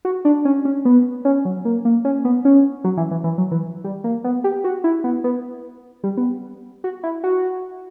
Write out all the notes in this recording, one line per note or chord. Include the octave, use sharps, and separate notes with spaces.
F#4
D4
C#4
C#4
B3
C#4
F#3
A#3
A#3
C#4
B3
C#4
F#3
E3
E3
E3
F#3
E3
G3
A#3
B3
G4
F#4
E4
B3
B3
G3
B3
F#4
E4
F#4